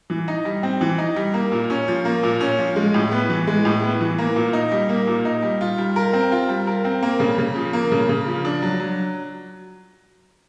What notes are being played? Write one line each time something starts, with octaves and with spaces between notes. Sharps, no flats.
E3
D#4
G3
C4
E3
D#4
G3
A#3
A#2
C#4
F3
A#3
A#2
C#4
F3
G#3
A2
B3
E3
G#3
A2
B3
E3
A#3
A#2
D#4
G3
A#3
A#2
D#4
G3
F4
G3
A#4
C4
F4
G3
A#4
C4
A#3
C#3
C#3
F3
A#3
C#3
C#3
F3
D4
F#3
F#3